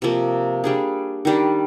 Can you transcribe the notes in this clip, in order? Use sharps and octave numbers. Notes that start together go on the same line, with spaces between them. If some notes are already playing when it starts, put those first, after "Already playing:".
C3 F3 A#3
G3 D4 G#4
D#3 G3 D4